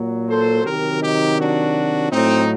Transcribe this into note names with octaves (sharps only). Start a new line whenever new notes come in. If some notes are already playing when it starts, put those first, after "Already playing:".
Already playing: A#2 F#3
A4 C5
C3 D#3 F#3 G4 A#4
D#4 G4
D4 F#4
A2 F#3 C4 D#4